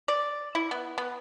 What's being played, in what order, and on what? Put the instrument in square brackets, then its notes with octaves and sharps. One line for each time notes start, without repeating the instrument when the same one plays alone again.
[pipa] D5
E4
B3
B3